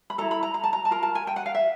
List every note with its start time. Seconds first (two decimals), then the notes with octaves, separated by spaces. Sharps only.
0.10 B5
0.18 E4 A4 A#5
0.31 B5
0.43 A#5
0.54 A#5
0.64 A5
0.73 A#5
0.85 A5
0.91 F4 A#4 A#5
1.03 A5
1.15 G#5
1.27 G5
1.36 F#5
1.46 F5
1.55 E5